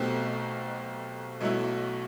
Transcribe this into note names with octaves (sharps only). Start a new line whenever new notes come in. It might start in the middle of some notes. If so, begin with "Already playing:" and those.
Already playing: B1 B2 A3 C4 G4
B1 B2 F#3 A3 E4